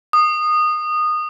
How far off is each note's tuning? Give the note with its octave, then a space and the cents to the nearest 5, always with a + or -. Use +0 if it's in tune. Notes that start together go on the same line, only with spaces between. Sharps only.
D#6 -20